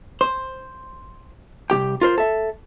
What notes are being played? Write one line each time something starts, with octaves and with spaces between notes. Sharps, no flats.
C5
C2 F3 G4 G5
F4 A#4 C5
A4 E5